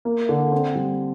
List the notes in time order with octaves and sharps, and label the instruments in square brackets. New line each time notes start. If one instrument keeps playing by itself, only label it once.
[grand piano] A#3
D3
C4
G3